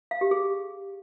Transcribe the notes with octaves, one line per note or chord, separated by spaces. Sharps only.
F5
G4
G#4